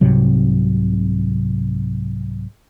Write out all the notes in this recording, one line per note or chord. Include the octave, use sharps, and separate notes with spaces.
C2 G#2 C3 F#3